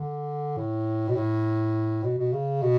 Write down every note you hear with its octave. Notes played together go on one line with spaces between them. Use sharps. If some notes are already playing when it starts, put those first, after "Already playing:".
Already playing: D3
A2
B2
A2
B2
B2
C#3
B2